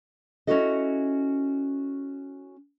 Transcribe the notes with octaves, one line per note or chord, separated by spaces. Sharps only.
C#4 D#4 E4 F#4 A4 D#5